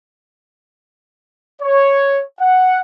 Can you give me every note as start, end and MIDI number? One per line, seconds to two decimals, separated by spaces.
1.62 2.23 73
2.40 2.80 78